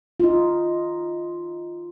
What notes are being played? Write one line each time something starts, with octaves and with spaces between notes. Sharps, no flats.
D#4 F4